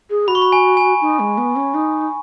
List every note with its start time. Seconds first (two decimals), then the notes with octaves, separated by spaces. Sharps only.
0.10 G#4
0.28 F#4 B5
0.35 C#6
0.42 B5
0.52 G#5
0.77 G#5
1.01 D#4
1.20 G#3
1.38 B3
1.56 C#4
1.74 D#4